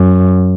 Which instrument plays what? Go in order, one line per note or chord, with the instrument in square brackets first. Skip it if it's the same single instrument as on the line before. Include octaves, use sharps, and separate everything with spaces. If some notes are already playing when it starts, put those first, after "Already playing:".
Already playing: [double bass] F#2